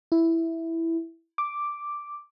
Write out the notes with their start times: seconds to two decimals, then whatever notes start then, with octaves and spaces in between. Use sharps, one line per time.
0.12 E4
1.38 D6